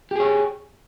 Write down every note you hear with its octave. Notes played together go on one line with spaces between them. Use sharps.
G4 G#4 C#5